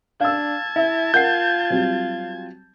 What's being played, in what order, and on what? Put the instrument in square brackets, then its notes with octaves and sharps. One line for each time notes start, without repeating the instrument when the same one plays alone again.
[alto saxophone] D4 [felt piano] F5 E6 [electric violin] A5 G#6
[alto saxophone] E4 [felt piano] E5
[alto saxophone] F4 [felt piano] A#4 F#5 C7 [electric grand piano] G6
[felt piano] F#3 G3 C4